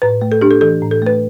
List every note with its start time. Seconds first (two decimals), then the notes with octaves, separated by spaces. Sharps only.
0.02 A2 B4
0.21 A3
0.32 A4
0.41 D4 G4
0.51 A4
0.61 E3 A4
0.81 A2
0.91 A4
1.02 A3 B4